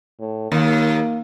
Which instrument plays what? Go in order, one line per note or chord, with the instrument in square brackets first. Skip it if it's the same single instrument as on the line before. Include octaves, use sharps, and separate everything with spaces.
[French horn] A2
[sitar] D#2 [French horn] A#3